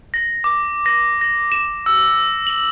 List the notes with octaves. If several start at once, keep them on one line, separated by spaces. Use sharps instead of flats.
A#6
D6
A#6
A#6
E7
E6
F#7